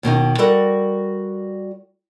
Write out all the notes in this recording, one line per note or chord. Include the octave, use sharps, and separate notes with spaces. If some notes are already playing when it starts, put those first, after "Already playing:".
D#2 B2 D#3 D#4
G3 F#4 A4 A#4 D#5 F#5